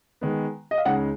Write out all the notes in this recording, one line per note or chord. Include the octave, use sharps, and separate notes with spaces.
D#3 G#3 B3
D#5
F5
C#2 C#3 G#3 D#4 F#5